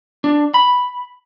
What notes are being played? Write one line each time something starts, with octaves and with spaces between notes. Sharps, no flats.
D4
B5